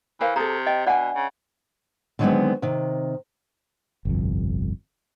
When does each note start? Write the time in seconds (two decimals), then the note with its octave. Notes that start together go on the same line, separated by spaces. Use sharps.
0.21 E3 A#4 C5 F5
0.36 C3 G#4 A4 A#5
0.67 D#5 G5
0.86 B2 D4 D5 F#5 G#5
1.15 C#3
2.19 D3 D#3 F#3 G#3 B3 C4
2.62 C3 D#3
4.05 G1 C2 F2